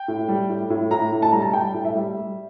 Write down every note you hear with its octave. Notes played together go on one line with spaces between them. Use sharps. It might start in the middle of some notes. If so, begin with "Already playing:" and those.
Already playing: G5
A2
G3
A2
A2
A2 A#5
A2
A5
G3 A#5
A5
G3 G5
A2
E5
G3
G3